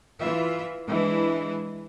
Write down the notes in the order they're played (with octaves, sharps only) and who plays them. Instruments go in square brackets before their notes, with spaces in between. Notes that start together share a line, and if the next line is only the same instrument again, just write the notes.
[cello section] E3 F4 E5
E3 G#3 D4 E4